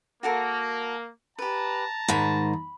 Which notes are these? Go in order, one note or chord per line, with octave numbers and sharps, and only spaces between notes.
A#3 F#4 A4 A#4
G4 B4 A5 A#5
G#2 D#3 B5